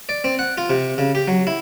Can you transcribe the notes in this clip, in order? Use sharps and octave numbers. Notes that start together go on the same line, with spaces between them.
D5
C4
F#5
F4
C3
C#3
G4
F#3
E4